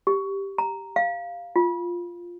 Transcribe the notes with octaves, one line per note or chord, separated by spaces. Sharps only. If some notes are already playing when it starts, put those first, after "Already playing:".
G4
A#5
F5
F4